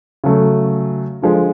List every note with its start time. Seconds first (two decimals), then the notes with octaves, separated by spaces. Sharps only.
0.24 C#3 F#3 A3
1.22 D3 F3 G#3